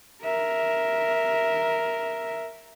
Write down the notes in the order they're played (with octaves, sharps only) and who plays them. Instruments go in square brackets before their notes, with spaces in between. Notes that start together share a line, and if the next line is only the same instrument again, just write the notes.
[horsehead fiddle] A#4 E5